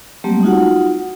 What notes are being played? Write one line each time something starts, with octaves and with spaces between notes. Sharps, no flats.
F#3 G3 A3 A#3 C4 G4
D#4 F4 F#4 F#5